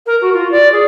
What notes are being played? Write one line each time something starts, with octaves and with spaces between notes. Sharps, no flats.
A#4
F#4
F4
D5
G#4